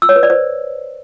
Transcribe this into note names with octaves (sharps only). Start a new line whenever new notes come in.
E6
C#5
B4
D5
C5